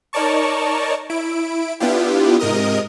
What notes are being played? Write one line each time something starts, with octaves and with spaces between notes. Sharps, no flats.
D#4 A#4 C#5 D5 A5 C#6
E4 D7
B3 D4 E4 F4 G4
G#2 C3 A#4 D#5 D#6